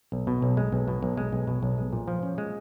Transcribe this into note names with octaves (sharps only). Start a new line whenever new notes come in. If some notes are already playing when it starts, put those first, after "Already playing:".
B1
B2
B1
G#3
B1
B2
B1
G#3
B1
B2
B1
G#3
A#2
F3
C#4
G#3